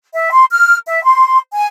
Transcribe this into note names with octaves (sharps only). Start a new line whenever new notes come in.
E5
C6
F6
E5
C6
G#5